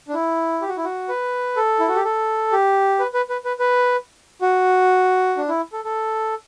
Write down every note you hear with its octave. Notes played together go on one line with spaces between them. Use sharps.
D4
E4
G4
F#4
E4
F#4
B4
A4
E4
F#4
G4
A4
G4
B4
B4
B4
B4
B4
F#4
D4
E4
A4
A4